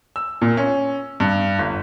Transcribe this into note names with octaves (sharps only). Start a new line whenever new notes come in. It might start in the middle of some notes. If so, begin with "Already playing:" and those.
E6
A#2
C#4
G2
G1